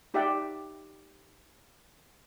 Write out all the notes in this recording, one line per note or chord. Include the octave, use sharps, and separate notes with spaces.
D#4 G4 D5 E5 F#5 G5